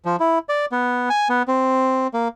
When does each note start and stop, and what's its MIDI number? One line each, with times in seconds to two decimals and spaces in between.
0.05 0.16 53
0.20 0.39 64
0.49 0.66 74
0.72 1.09 59
1.10 1.28 80
1.29 1.43 59
1.48 2.07 60
2.14 2.28 58